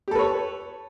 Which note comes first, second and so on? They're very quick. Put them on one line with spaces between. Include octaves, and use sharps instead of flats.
G4 A4 B4 C#5